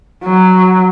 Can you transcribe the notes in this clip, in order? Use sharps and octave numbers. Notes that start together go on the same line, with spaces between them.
F#3